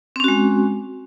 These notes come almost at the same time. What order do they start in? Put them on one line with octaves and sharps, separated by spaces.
C4 C#4 F#4 G#3